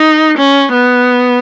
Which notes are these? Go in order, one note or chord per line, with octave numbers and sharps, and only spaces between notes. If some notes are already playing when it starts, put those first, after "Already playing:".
Already playing: D#4
C#4
B3